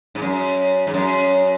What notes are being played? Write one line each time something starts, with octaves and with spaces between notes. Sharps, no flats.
G#2
F#2
G#2
F#2